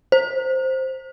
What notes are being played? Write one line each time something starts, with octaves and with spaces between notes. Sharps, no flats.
C5